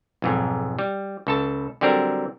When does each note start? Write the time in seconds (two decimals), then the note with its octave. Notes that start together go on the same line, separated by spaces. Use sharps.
0.22 B1 F2 G#2
0.79 G3
1.27 C#2 A4 A5
1.81 D3 F#3 G3 C4 D4 A#4